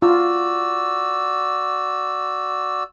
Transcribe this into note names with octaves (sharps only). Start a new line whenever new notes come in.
F4 F#4 D5 E6